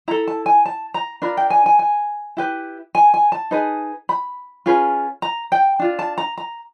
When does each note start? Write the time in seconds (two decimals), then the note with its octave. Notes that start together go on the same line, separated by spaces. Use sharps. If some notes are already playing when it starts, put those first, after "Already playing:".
0.08 E4 A4 A#5
0.27 A5
0.46 G#5
0.66 A5
0.94 A#5
1.22 D4 F4 A#4 B5
1.37 G5
1.50 G#5
1.66 G#5
1.79 G#5
2.37 E4 G4 B4
2.95 G#5
3.14 G#5
3.32 A5
3.51 D#4 G#4 B4
4.09 B5
4.66 C#4 F4 G#4 B4
5.22 A#5
5.52 G5
5.79 D4 F4
5.99 A5
6.18 A#5
6.37 A#5